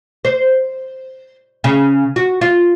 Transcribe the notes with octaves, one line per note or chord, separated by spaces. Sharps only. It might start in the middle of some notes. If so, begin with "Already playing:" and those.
C5
C#3
F#4
F4